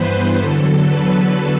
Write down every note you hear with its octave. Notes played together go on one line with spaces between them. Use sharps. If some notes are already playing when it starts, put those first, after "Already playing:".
Already playing: G2 E3 B3 B4 C5
E2 D3 F#3 A4
B4